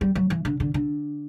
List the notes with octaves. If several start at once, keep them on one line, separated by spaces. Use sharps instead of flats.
G3
F#3
E3
D3
D3
D3